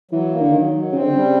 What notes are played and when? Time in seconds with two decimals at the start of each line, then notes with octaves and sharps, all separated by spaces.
0.11 E3 F#3
0.32 A#3
0.41 D3
0.52 D#3 F#3
0.73 F#3
0.92 C#3 C4
1.02 D3
1.12 C#3 G3